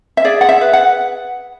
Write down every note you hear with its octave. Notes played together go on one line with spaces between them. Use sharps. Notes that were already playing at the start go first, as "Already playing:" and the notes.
E5
G#4 D5
F#5
E5
B4
F#5